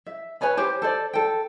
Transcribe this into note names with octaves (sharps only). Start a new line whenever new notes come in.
E5
B4 C#5 G#5 B5
G4 C5
A4 C5 D5
A4 G5